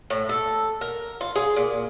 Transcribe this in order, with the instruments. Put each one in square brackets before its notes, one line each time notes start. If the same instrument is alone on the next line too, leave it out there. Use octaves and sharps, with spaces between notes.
[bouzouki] A2
A4
A#4
F4
G#4
A#2